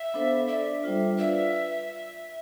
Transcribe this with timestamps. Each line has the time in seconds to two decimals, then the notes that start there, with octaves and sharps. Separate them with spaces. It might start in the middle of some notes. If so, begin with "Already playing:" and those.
Already playing: E5
0.14 B3 D4 A4 C5 F5
0.48 D4 A4 D5 E5
0.82 G3 D4 F4 C5
1.17 F4 B4 D5 E5 F5